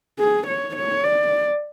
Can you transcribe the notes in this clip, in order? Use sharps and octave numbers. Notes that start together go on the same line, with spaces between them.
G#4
C#5
C#5
D5